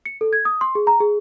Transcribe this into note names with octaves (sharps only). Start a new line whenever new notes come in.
C#7
A4
G#6
D#6
C6
G#4
A#5
G#4